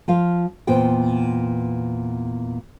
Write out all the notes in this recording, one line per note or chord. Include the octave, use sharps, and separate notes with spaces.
F3 F4 F5
E2 A#2 B3 C5 G5